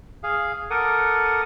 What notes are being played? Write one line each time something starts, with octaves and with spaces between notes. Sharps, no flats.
G#4 F5
A4 A#4 F#5 D6 D#6